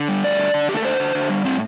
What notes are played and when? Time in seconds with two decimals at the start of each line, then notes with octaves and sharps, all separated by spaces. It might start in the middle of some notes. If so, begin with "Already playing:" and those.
Already playing: D3
0.08 G3
0.24 A3 D5
0.39 D3
0.54 D3
0.69 A3 G4
0.77 A4
0.84 D3 C5
1.00 D3
1.15 D3
1.30 G3
1.45 A2 C4